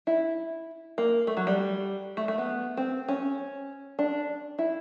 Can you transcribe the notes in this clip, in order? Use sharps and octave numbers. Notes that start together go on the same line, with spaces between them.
E4
A#3
A3
F#3
G3
A3
A3
B3
C4
C#4
D4
E4